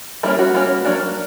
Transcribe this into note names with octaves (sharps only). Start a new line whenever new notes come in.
G3 A#3 C#4 E4
F#4
G3 A#3 C#4
F#3 A#3 D4